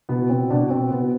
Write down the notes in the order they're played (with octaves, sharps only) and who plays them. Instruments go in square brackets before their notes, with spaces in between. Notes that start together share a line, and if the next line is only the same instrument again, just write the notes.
[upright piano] B2 B3
B2 C4
B2 D4
B2 C4
B2 B3